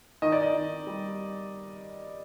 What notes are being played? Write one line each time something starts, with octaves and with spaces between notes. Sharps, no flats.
D#3 D#5
D5
D#5
D#3
G3